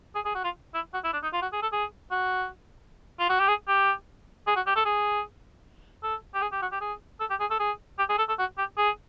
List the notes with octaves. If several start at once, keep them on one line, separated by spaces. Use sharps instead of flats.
G#4
G#4
F#4
F4
E4
F#4
E4
D4
D#4
F4
F#4
G#4
A4
G#4
F#4
F4
F#4
G4
G#4
G4
G#4
F#4
G4
A4
G#4
A4
G4
G#4
G4
F#4
G4
G#4
A4
G4
G#4
A4
G#4
G4
G#4
A4
A4
F#4
G4
G#4